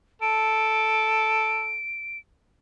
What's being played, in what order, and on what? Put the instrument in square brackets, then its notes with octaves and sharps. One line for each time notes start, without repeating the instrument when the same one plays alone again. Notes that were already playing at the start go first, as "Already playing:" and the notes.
[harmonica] A4 [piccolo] D7